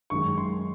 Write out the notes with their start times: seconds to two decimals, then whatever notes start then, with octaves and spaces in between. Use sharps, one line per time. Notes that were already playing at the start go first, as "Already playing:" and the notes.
0.10 F#2 D#3 G#3 C#6
0.38 C6